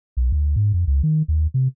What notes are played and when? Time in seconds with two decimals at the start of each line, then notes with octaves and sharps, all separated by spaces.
0.17 B1
0.32 D2
0.56 G#2
0.73 F2
0.87 C#2
1.03 D#3
1.28 D#2
1.54 C3